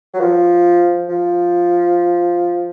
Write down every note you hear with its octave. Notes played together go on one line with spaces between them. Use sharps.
F#3
F3
F3